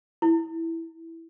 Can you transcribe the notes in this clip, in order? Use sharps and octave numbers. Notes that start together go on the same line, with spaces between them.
E4